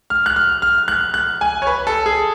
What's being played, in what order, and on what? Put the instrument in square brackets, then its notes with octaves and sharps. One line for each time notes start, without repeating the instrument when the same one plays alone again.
[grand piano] F6
F#6
F6
F6
F#6
F#6
G#5
C#5
B4
A4
G#4